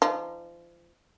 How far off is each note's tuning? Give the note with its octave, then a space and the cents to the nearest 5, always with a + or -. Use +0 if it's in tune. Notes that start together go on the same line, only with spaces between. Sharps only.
F3 -30 D#4 -45